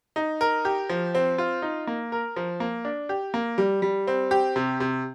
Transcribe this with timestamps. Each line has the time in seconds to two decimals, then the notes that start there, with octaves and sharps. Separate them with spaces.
0.16 D#4
0.41 A#4
0.65 G4
0.89 F3
1.15 C4
1.38 F4
1.62 D#4
1.87 A#3
2.12 A#4
2.36 F3
2.60 A#3
2.85 D4
3.09 G4
3.34 A#3
3.58 G3
3.82 G3
4.07 C4
4.31 G4
4.56 C3
4.80 C3